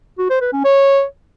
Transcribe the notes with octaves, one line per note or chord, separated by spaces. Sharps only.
F#4
C5
B4
C#4
C#5